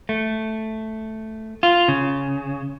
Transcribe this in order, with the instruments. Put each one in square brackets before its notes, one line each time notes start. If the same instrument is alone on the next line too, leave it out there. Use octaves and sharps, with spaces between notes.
[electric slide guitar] A3
F4
C#3